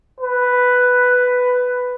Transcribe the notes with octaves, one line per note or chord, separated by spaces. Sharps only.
B4